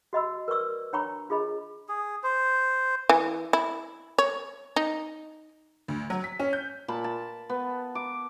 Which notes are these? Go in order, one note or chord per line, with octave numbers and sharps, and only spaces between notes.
F#4 D#5 B5 E6
A#4 B4 D5 C#6 E6
D4 C#5 G5 A#5 B5 C#6
D4 F4 G#4 D#5 B5
G#4
C5
E3
E4
C#5
D#4
D2
F#3
B6
C#4
G6
A#2 A5 B5
A5
B3
D6